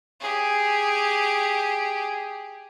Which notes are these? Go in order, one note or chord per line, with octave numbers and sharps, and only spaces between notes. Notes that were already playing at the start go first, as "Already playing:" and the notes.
G4 G#4